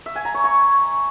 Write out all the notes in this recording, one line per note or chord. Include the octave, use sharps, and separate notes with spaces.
E5
G#5
A#5
C#5
C#6